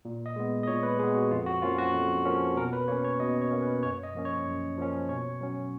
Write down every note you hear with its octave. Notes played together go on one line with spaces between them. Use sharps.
A#2
D#5
G#3 B3
D#5
A#2 C#5
B4
G#3 B3 G#4
F#4
F2 F4
F#4
F3 A#3 C#4 F4
F#4
F2
F3 A#3 C#4
B2 A#4
B4
A#3 C#4 C#5
C#5
B2 D#5
C#5
A#3 C#4
B4
F#2 C#5
D#5
F3 A#3 C#4
C#5
F#2
F3 A#3 C#4
B2 C#5
F#3 C#4